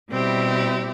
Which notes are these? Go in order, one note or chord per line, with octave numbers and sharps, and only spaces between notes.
B2 G3 C4 E4 G4